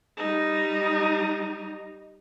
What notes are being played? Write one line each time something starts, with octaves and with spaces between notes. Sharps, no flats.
G3 D#4